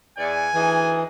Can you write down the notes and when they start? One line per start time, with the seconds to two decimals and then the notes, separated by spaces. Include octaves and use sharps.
0.18 E2 D5 G#5
0.54 D2 E3 D#4 G#4